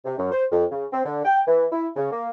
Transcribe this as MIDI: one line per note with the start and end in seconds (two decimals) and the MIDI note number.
0.05 0.14 48
0.18 0.31 42
0.32 0.44 72
0.51 0.65 41
0.72 0.85 49
0.93 1.03 60
1.05 1.23 50
1.25 1.40 79
1.47 1.65 52
1.72 1.88 64
1.96 2.11 49
2.12 2.30 58